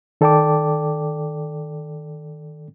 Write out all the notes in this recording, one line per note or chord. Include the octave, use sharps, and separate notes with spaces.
D#3 A4 D5 G5 A5 D6